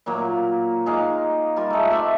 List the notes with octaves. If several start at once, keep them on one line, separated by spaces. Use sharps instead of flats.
A#2 F#3 A#3
G#3 D#4 F5 D6
G3 F4 A#4
G#3 A3
C4 D5 E5